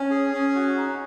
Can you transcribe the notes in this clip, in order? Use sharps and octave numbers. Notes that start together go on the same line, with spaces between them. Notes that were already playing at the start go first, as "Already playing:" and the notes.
Already playing: C#4
G#4
C#4
F#4
D#4